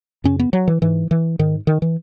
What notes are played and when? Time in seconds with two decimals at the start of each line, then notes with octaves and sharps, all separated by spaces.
0.24 F#2 C#3 C#4
0.39 B3
0.53 F#3
0.68 E3
0.82 G#2 E3
1.11 E3
1.39 G#2 D#3
1.67 D#3
1.82 E3